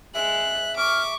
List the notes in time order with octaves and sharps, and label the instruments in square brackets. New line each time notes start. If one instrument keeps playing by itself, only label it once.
[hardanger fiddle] G#3 [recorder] E5 [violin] F#6
[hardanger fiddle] C#6 [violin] D6 [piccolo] F6